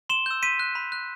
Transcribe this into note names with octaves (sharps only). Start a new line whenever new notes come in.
C6 E7 G7
E6 G6
C6 B6 D#7
F#6
B5
F#6